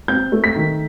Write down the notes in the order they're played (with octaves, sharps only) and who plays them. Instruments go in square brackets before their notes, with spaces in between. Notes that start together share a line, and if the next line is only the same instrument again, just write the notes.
[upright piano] C4 G6
A3
B6
D#3